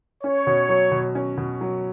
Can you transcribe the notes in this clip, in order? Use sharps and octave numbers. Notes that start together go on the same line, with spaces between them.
C#4 C#5
B2
F#3
B2
C#4
B2
F#3